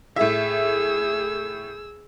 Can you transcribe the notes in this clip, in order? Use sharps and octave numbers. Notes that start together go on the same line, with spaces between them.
A2 G#4 E5 E6